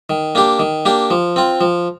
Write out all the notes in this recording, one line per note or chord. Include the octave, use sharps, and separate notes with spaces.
D#3
A#3 D4 G4
D#3
A#3 D4 G4
F3
C4 F4
F3